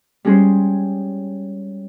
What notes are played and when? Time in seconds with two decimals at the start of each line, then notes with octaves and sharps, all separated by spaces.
0.25 G3 G#3 C#4 G#4 C5